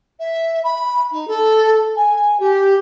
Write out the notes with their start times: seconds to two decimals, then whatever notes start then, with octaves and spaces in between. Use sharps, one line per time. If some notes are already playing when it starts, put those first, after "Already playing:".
0.20 E5
0.64 B5
1.11 D#4
1.27 A4
1.96 G#5
2.39 G4